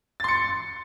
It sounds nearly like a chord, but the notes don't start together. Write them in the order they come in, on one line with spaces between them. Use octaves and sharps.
A6 C6 C#7